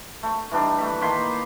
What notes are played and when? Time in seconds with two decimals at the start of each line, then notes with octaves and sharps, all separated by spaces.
0.23 A3 C#6
0.51 E3 G3 D4 D#4
0.78 A3 B5
1.01 D#3 A#3 B5 C6